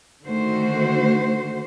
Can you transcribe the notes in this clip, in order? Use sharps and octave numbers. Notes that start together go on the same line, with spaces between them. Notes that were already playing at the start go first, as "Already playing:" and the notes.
D3 D#3 A3 F#4 C5